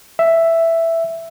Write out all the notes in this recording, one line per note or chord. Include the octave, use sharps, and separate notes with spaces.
E5